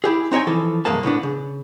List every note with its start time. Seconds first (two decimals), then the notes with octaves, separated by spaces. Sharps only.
0.04 E4 G4 G#4
0.32 C4 D#4 C#5 G5 G#5
0.47 E3 F3 A4
0.85 C2 G2 G#3 A#3 A5
1.03 A2 C#3 B3 D4
1.23 C#3